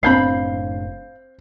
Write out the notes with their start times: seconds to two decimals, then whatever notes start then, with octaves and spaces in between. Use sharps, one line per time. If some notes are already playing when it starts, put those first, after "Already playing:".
0.03 F#1 A2 C4 D4 F5 B5 G6 C7